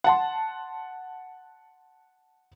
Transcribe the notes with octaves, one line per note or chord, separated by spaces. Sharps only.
F#5 A5 C6